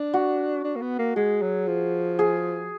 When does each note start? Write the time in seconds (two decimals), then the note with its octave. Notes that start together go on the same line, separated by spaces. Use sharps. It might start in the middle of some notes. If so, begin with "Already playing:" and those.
Already playing: D4
0.14 F#4
0.64 D4
0.76 A#3
0.81 B3
0.99 A#3
1.16 G#3 G#4
1.42 F#3
1.67 F3
2.19 G#4